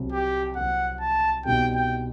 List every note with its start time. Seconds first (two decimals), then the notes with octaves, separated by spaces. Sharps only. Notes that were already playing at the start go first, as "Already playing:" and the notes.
Already playing: C2 C3 F#3
0.12 G4
0.56 C2 C3 F#3 F#5
1.00 A5
1.45 C2 B2 G3 D#4 G5
1.75 G5